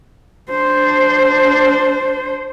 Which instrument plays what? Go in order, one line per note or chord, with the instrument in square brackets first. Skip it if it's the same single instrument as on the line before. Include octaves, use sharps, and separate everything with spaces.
[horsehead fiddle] D4 C5